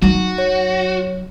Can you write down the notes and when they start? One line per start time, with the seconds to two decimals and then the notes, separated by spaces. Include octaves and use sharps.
0.02 F#3 D#4 F#4
0.38 C#5